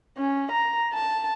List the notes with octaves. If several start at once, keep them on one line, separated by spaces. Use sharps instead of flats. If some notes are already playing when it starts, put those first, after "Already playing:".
C#4
A#5
A5